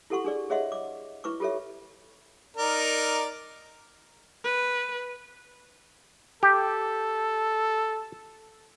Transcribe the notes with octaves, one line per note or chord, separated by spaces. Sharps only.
E4 G4 A4 F#5 C6 C#6
D4 G#4 D5
G#4 C#5 D#5 E5 F#5 C6
D6
E4 B4 C#6 D6
F4 G4 A4 C#5 E5
D#4 A#4 D5
B4
G4 A4